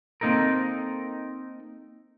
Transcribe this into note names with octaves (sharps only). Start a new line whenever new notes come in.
A#3 C4 D#4 A4 A#4